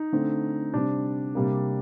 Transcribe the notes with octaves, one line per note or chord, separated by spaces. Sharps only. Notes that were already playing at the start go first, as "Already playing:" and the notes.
Already playing: D#4
D3 A3 C4
C3 G3 C4 D4
C3 G3 A#3